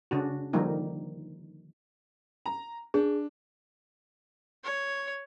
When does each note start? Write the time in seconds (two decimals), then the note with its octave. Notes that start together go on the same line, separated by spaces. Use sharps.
0.11 C#3 D4 F#4
0.53 D3 D#3 F3 G3 A#3 D#4
2.46 A#5
2.94 D4 G#4
4.64 C#5